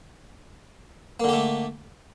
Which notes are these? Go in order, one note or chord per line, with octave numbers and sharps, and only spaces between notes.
D3 A3 A#3 G4